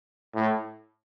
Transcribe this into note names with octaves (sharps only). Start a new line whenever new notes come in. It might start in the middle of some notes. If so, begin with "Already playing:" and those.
A2